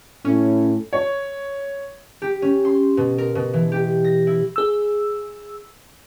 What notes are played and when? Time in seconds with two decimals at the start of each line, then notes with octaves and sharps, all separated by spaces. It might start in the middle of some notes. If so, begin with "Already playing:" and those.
0.25 A2 C#4
0.93 C#5
2.22 G4
2.42 C#4
2.65 C6
2.97 B2
3.18 A#4
3.35 B2
3.53 E3
3.72 G4
4.04 A#6
4.27 E4
4.56 G#4 E6